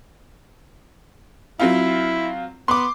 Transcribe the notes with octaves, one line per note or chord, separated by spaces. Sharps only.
F#3 C4 E4 F4
B3 C6 D6